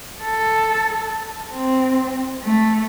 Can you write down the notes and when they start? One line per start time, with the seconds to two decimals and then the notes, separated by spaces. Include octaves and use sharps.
0.23 A4
1.53 C4
2.44 A3